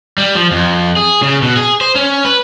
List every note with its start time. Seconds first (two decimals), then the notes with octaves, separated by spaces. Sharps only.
0.18 G3
0.35 F3
0.52 F2
0.96 G#4
1.22 C#3
1.42 B2
1.57 G#4
1.81 C5
1.95 C#4
2.25 B4